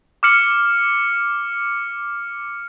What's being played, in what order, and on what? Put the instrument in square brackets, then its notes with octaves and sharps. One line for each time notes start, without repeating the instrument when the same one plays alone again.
[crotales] D6 F6 C#7 F#7